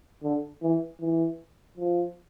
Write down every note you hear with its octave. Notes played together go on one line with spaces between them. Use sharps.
D3
E3
E3
F3